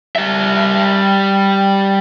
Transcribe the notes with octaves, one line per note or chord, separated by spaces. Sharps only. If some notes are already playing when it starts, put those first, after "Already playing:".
G3 E5